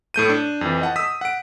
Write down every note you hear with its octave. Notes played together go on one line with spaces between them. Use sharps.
A2 A3 G6 D#7
D4
F2 E3
D#5 F#5 A5
D#6 E6 B6
F#5 D7